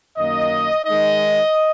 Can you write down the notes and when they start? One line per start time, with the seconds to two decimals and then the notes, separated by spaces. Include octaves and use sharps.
0.17 F#2 D#3 A#3 D#5
0.85 D#3 G#3 D#4 D#5